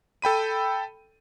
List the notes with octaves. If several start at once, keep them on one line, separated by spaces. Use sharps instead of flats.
A4 G5 B5 D#7